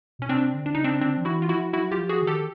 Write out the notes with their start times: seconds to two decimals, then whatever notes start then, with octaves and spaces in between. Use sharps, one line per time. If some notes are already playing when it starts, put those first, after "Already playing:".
0.19 B2 C#4
0.29 C3 C4 D4
0.54 D3
0.66 D4
0.75 C#3 D#4
0.84 C4 D4
1.01 D3 C4 D4
1.17 F3
1.25 E3 E4 F#4
1.42 F4
1.49 F3 E4 F#4
1.73 F#3 E4 F#4
1.91 F4 G4
1.98 F3
2.09 F#4 G#4
2.22 D#3
2.27 G4 A4